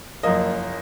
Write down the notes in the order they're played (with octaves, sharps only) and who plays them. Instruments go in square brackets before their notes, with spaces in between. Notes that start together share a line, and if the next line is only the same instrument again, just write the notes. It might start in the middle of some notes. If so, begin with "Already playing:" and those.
[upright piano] F#1 F#2 F3 A#3 D#5